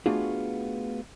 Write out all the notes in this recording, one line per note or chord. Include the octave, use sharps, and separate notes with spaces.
A3 B3 D4 F4 F#4 G#4